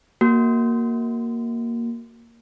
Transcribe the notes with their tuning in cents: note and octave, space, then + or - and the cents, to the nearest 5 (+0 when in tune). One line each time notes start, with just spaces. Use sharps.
A#3 +0 F#4 +0